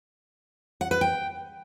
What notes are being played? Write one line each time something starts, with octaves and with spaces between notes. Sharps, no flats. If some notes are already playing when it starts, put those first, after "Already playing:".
F#5
B4
G5